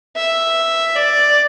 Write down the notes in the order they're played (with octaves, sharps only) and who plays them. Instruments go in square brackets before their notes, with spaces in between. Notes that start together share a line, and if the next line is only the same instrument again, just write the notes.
[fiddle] E5
D5